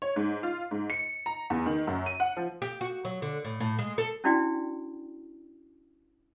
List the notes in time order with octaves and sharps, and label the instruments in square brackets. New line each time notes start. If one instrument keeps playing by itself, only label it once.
[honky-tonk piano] C#5
G#2
F4
G#2
C#7
A#5
E2
D#3
F#2
D#7
F#5
F3
[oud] G4
F#4
F#3
D3
A2
A2
G#3
A4
[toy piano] C#4 D4 E4 F#4 D5 G5